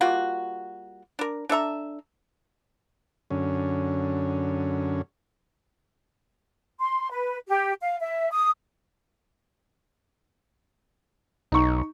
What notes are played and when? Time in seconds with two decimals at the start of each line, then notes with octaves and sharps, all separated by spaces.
0.01 G3 A#3 F4 F#4
1.19 D4 A#4
1.49 D4 A4 E5 A#5
3.31 F#2 D3 C#4
6.79 C6
7.10 B4
7.47 G4
7.81 F5
8.00 E5
8.31 D#6
11.52 B1 D#4 C#6